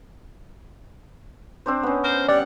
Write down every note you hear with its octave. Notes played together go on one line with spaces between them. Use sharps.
C4 D4 C5
B3 C#4
A#4 C5
G3 D5 F#5